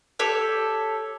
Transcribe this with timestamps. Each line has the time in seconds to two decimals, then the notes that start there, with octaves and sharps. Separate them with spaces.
0.19 G4 A4 C#5